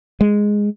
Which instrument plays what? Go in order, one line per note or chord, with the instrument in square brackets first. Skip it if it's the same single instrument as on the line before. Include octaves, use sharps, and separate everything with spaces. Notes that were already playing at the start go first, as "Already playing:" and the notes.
[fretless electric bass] G#3